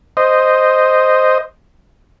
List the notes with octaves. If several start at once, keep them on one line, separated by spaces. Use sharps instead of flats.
C5 D#5